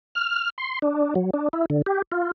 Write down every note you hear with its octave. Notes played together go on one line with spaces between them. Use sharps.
F6
C6
D4
F#3
D4
E4
D3
G4
F4